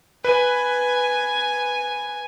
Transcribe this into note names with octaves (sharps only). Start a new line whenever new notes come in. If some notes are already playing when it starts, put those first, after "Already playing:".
B4 G#5 D#7